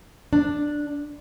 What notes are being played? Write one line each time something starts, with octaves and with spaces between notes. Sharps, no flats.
D4